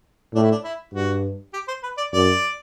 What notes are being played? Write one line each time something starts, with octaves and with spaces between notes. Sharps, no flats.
A2 D4
E4
D4
E4
G2 F#4
G4
C5
B4
D5
F#2 D5